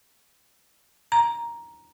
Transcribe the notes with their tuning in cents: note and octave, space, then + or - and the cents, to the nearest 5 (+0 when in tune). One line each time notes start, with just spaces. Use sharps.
A#5 +10